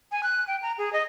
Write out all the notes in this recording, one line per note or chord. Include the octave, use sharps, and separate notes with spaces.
G#5
F#6
G5
A#5
G#4
D#5